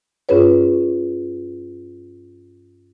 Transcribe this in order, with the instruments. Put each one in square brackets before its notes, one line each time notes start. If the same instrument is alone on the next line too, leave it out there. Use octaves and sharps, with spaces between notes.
[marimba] G2 C#4 F4 G#4 B4 C#5